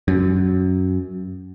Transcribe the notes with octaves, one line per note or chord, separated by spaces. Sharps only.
F#2